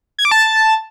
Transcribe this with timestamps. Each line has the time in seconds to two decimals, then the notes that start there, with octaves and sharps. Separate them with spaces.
0.19 G#6
0.25 D6
0.31 A5